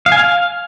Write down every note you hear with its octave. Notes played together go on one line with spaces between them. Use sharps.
F5
G#5
F5